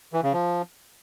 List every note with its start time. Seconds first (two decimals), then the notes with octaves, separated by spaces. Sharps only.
0.13 E3
0.23 C#3
0.33 F3